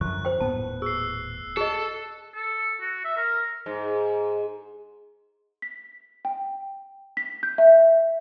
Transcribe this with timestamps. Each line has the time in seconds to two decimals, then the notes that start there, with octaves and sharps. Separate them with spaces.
0.01 F#2 D3 F3 C#6 F#6
0.25 C5 G5
0.40 D#1 A2 B3 A5
0.82 G#4 E6 C7
1.57 G#4 A4 D#5
2.34 A4
2.80 F#4
3.05 E5
3.17 A#4
3.66 G#2
5.62 B6
6.25 G5
7.17 B6
7.43 G6
7.58 E5